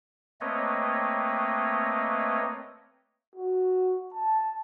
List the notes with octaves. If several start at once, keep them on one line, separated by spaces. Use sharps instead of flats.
A3 A#3 C4 B4 C#5 D#5
F#4
A5